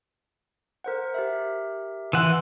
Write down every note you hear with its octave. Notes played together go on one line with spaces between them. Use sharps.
A#4 C5 F#5
G4 A#4 E5
E3 F#5 C6 E6